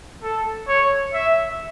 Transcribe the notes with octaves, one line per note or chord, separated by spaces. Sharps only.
A4
C#5
E5